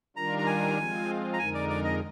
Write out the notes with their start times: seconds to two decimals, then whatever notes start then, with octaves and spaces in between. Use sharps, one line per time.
0.16 D#3 G3 D4 F4 A#4 A#5
0.39 A#5
0.47 G#5
0.78 F3 G#3 C4 F4
1.33 A#5
1.39 F2 D3 G#3 D#4 A#4 G#5
1.54 D5
1.69 D5
1.84 D#5